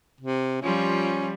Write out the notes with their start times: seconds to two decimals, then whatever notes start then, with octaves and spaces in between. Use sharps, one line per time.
0.20 C3
0.62 F3 G3 C#4 F4